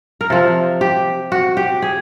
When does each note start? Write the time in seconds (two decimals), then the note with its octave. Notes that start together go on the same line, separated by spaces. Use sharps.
0.21 A#4
0.30 C3 F3 A4
0.81 G4
1.32 F#4
1.57 G4
1.82 G#4